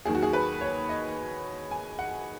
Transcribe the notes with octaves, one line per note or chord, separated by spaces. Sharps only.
D#2 D#3 F#3 G#4
F#4
G#4
B4
C#5
D#5
G#5
F#5